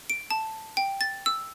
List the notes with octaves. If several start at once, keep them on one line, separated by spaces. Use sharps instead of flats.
D7
A5
G5
A6
E6